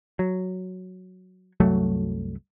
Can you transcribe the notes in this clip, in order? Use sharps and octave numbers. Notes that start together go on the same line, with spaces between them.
F#3
C2 F#2 F#3 A3